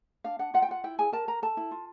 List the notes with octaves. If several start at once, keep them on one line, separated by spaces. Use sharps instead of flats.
D4 F5
D4 F#5
F4 F#5
G5
F4 F#5
E4 G5
G#4 G#5
A#4 A5
A#4 A#5
A4 A5
E4
F4